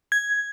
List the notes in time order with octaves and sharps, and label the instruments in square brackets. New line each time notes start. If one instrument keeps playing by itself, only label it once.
[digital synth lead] G#6